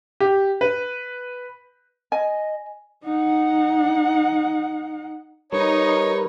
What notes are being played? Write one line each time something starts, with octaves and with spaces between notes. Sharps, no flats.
G4
B4
D#5 G#5
D#4 F#5
G3 D#4 A#4 B4 C#5